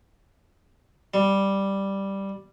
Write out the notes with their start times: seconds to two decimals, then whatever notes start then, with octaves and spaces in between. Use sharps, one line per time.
1.14 G3